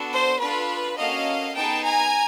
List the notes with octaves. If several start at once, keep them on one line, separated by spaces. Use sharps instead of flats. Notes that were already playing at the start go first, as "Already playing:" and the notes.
Already playing: B3 D4 F#4 A4
C5
D4 F4 A4 B4
A#3 C#4 F#4 A4 D#5 F5
B3 D#4 G#4 G5 A5
G#5 A#5